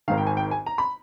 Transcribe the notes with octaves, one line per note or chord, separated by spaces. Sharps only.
G#1 G#2 D#3 F5
G5
G#5
G5
G#5
A#5
B5